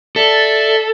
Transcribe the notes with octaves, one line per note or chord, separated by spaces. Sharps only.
A4 D5 E5